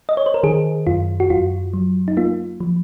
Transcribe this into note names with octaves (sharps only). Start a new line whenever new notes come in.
D#5
C#5
C5
A#4
D#3 G#4
F#2 F4
F#4
F#2 F4
F#3
D#4
A#3 F4
F3